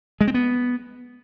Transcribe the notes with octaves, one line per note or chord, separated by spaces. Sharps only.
G#3
C4
B3